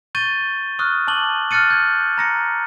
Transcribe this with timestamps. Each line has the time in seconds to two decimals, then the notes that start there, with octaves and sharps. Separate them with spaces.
0.15 C#6 G6 A6 D#7 G7
0.79 C#6 D#6 F6 F#6
1.08 A5 D6 F#7 G7
1.51 F6 F#6 A6 C#7 D#7
1.70 G6 G#6
2.18 A#5 A#6 C#7